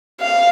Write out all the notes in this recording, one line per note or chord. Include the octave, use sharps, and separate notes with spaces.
F5